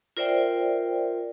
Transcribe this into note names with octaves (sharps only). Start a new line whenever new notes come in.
F4 A#4 C5 D5 E5 G5